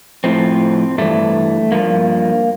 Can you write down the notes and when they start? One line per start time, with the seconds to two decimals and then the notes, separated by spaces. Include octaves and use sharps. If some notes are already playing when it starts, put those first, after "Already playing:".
0.24 A2 F3 C4
0.98 G2 E3 A3
1.72 G2 F3 A#3